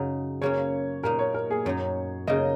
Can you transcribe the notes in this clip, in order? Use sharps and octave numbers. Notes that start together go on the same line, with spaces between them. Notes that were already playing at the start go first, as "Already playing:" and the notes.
Already playing: F#2 C#3 F#3 D#4
C#3 A#3 C#4 C#5
A#2 A#3 D#4 A#4
C#5
A#4
G#4
F#2 F#3 D#4 C#5
C#3 A#3 D#4 D#5